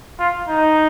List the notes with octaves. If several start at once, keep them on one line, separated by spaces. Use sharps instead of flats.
F4
D#4